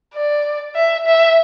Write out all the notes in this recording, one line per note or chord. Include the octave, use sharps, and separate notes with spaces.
D5
E5
E5